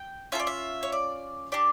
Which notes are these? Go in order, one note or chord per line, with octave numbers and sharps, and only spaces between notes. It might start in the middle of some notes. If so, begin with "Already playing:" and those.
Already playing: G5
C#4 F4 A4 E5
D5
E5
C#5
D5
D4 G4 D5